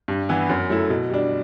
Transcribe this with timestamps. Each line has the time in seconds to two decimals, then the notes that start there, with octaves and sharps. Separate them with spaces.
0.08 G2
0.29 E3 B3 E4
0.50 F#2
0.69 F#3 A3 E4
0.90 B2
1.10 G3 D4